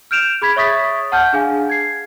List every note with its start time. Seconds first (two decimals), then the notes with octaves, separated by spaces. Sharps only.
0.11 F6 G6 D7 E7 F7
0.42 G#4 B5 G#6 B6
0.56 C#5 E5 C#6 D#6 A6 B6
1.12 F#5 A5 F6 G6
1.33 D4 G#4 F5 G#5
1.69 G#6 C7